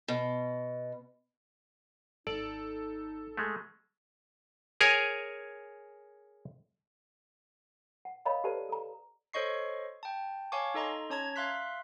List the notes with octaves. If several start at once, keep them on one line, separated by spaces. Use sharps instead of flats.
B2
G#1 D#4 A4 D5
G#3 A3
G#4 A#4 C#5 G#5
F#5
A#4 C#5 D#5 F5 A#5 B5
G4 A4 B4 C5 D5 A5
A4 A#5
A4 C5 C#5 D#5 C#6 C7
G5 A5
C#5 F5 G#5 A5 C#6 D6
D#4 A4 D#5 A#5 C6
C#4 C#5 A5 A#5 G#6
E5 F5 C6 F#6 B6